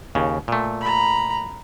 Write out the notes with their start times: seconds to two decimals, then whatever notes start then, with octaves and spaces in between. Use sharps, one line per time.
0.15 D#2 C#3
0.48 A#2 A3
0.81 A#5 B5